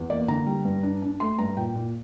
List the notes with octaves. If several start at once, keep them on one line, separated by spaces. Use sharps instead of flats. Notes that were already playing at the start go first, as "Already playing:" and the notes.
Already playing: E2
A#3 D5
D3 A#5
G3
G2
D4
D4
A3 C6
G2 A#5
A#2 G5
A#2